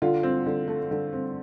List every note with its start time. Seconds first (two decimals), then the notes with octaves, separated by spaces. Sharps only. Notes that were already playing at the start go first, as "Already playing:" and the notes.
0.02 D3 F4
0.23 C4
0.46 D3
0.68 A3
0.91 D3
1.13 C4